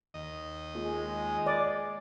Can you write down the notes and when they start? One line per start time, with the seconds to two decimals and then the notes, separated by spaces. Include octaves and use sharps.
0.14 D#2 D#5
0.75 G#3 A#3 F4
1.46 D5